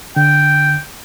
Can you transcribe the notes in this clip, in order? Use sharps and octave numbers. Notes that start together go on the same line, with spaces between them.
D3 G5